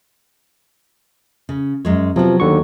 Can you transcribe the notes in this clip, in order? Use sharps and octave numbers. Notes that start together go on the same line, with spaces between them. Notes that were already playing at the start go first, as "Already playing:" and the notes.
C#3
F#2 G#3 C#5
C3 F3 F#3 B3
D#2 D3 C#6